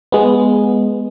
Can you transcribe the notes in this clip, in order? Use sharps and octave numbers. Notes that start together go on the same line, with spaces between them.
G#3 B3